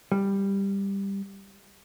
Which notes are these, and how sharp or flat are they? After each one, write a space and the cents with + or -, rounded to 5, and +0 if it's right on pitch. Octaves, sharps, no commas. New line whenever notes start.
G3 +10